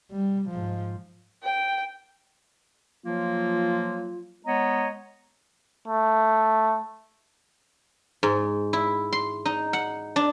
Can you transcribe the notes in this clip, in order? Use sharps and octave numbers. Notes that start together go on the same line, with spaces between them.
G3
G#2 F3
G5
F3 F#3 A#3 F4
G#3 B3 C#5 D#5 A#5
A3
G#2
E4
C6
D#4
F#5
D4